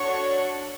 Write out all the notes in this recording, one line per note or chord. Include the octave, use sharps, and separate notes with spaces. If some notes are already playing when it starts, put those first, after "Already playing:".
Already playing: D4 F#4 A4 C#5 C#6